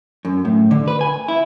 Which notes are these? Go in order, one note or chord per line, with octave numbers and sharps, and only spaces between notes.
F#2
A2
D3
B4
G#5
E4